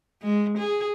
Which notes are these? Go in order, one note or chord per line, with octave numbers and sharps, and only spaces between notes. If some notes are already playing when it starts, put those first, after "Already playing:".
G#3
G#4